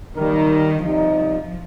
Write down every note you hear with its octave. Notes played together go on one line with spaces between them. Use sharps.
D#3 G3 A#3 D#4 G4 A#4
C3 F3 G3 D#4